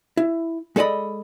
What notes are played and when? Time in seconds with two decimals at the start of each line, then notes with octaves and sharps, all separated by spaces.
0.17 E4
0.76 G#3 A4 D5 D#5 B5